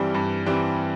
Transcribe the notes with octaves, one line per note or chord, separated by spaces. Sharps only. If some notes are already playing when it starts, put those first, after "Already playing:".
Already playing: G2 E3 G3 C4 G4
G2
E3 G3 C4 G4